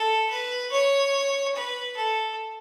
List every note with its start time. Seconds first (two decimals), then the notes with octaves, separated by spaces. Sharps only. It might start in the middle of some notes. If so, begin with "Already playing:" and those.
Already playing: A4
0.30 B4
0.72 C#5
1.56 B4
1.97 A4